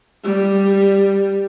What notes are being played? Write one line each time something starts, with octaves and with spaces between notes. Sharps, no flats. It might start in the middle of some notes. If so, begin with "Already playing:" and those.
G3